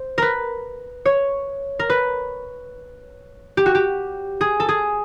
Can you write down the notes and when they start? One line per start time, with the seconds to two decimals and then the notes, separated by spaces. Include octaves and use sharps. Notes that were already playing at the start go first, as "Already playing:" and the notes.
Already playing: C5
0.18 A#4 B4
1.06 C#5
1.79 A#4
1.90 B4
3.57 G4
3.66 F#4
3.75 G4
4.41 G#4
4.60 A4
4.69 G#4